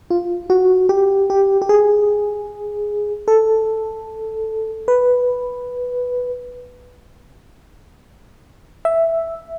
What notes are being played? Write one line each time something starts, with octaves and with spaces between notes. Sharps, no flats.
F4
F#4
G4
G4
G4
G#4
A4
B4
E5